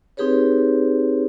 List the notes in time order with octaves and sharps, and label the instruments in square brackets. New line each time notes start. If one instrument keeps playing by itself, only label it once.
[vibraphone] C4 D#4 G4 G#4 B4 C#5